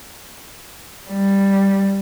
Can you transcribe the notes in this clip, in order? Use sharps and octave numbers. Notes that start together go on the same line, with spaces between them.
G3